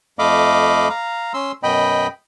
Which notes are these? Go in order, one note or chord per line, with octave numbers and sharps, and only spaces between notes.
F2 A3 D#5 F5 B5 D6
F5 A#5
C#4 C6 E6
F#2 B2 D#5 G5 B5